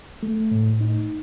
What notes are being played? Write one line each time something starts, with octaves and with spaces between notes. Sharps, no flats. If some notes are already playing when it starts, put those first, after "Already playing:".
A3
A2
D#4